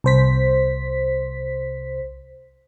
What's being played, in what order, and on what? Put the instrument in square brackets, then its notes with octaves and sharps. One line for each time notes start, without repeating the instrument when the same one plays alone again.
[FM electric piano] C2 C5 B6